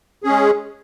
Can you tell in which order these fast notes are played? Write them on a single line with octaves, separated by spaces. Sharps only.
G#4 C#4 G#3